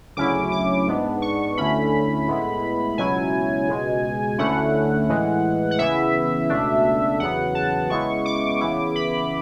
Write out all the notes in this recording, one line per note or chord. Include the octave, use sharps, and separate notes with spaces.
D2 C#3 F#3 C#4 E4 D6
D6
G#2 G#3 B3 D4
C#6
D2 D3 A3 C#4 E4 B5
A2 G#3 B3 E4
C#2 B2 F#3 C#4 E4 G#5
C#2 B2 G#3
D2 D3 A3 C#4 E4 F#5
A2 E3 G#3
F#5
C#3 E3 B3 E4 E5
C#2 B2 A3 D4
E2 C#3 F#3 B3 F#5
A5
C#3 G#3 B3 E4 C#6
D6
C#3 E3 B3 E4 D6
B5